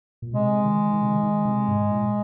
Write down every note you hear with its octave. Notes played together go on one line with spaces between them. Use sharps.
A#2
C3 G#3
D#3
D#3
C3
D#3
D#3
C3
G#2
A#2